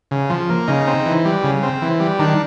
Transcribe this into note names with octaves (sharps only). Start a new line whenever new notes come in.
C#3
F3
A#3
C#3 D#4
C4
E3
G3
C#3
C4
E3
G3
D#3 D4